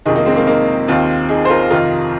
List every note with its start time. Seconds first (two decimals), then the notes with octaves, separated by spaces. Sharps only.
0.05 F2 C3 D#3 D#4 G#4
0.16 A#3 D#4
0.26 G#3 C4
0.36 A#3
0.47 A#3 D#4
0.88 D#2 D#3 C4 F4
1.29 D#4 G#4
1.45 C5
1.49 F4 A#4
1.70 F2 C3 D#3 F4 A#4